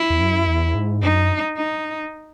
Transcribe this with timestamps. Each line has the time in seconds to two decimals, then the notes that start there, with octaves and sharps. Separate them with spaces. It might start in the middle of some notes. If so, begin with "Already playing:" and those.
Already playing: E4
0.10 E2
0.21 F#2
0.47 E2
0.75 G#2
1.02 F#2 D#4
1.57 D#4